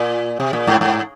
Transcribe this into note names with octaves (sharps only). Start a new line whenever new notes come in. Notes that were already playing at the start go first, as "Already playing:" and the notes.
Already playing: A#2
C3
A#2
G#2
G#2